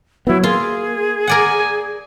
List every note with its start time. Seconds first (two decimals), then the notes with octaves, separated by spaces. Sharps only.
0.27 F#3 B3 E4
0.44 A#3 F4 G#4
1.27 A#4 D5 F#5 G#5